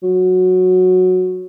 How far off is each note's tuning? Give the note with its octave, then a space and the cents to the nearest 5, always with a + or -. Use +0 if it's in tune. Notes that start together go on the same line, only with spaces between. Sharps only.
F#3 -10